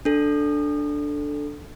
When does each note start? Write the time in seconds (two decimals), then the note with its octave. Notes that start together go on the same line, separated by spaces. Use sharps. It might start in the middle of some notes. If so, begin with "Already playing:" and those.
0.05 D4 A4